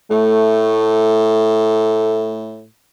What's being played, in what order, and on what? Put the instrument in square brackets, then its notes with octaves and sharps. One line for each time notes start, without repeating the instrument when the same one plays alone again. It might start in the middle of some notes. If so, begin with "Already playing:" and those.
[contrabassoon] A2 [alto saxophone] A3